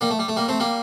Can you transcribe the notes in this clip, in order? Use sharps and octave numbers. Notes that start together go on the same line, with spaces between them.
G3 A#3
A3
G3
A3
G3 A#3
A3 C4
G3 A#3